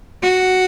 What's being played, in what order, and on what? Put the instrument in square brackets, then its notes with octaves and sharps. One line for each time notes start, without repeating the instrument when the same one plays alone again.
[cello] F#4